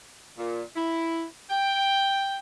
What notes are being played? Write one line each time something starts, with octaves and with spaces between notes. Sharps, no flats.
A#2
E4
G5